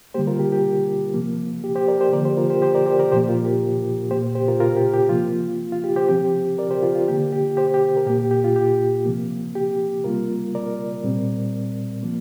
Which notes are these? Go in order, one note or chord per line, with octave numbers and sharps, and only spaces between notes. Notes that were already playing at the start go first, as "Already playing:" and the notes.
D3 G3 A#3 G4 C5
F4 A#4
G4
G4
C3 F3 A#3
G4
G4 C5
A#4 D5
G4 C5
D3 F3 A#3 A#4 D5
G4 C5
F4 A#4
G4 C5
G4 C5
A#4 D5
G4 C5
A#4 D5
A#2 F3 A#3 G4 C5
F4 A#4
G4
A#2 A#3 G4 C5
G4 C5
F4 A#4
F4 A#4
G4
G4
C3 F3 A#3 F4
F4
G4
G4 C5
C3 F3 C4 G4
A#4 D5
G4 C5
F4 A#4
F4
D3 A#3 G4
G4
G4 C5
G4
A#4
A#2 A#3 G4
G4
G4
F4
G4
C3 F3 A#3
G4
C3 G3 A#3 F4 A#4
A#4 D5
A#2 G3 C4
F3 A#3